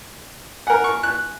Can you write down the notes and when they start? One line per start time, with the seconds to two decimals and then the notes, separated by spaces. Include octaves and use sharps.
0.67 A#4 F#5 G#5
0.84 C#6
1.03 F#6